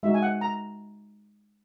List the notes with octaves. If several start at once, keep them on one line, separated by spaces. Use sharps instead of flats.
G#3 D#4 F#4 E5
G#5
F#5
A#5